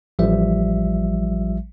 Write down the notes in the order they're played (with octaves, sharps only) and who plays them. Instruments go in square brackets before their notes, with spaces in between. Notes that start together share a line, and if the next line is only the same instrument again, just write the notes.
[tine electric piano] A1 F3 G3 E5